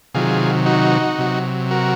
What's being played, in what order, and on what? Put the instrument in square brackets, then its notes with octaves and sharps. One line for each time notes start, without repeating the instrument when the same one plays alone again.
[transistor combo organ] C3 D#3 F#3 F4 G#4
D#4 F#4
C3 F#3
F#4 A#4